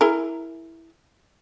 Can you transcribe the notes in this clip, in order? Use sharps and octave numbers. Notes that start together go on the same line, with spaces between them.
E4 G#4 A#4